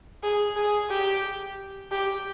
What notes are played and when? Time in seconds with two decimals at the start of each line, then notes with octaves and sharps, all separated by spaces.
0.23 G#4
0.56 G#4
0.90 G4
1.91 G4